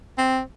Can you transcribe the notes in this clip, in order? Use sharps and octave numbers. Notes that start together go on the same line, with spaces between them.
C4